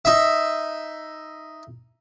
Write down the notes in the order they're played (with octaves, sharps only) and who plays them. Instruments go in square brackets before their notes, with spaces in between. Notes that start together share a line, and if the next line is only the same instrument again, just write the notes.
[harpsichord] D#4 E5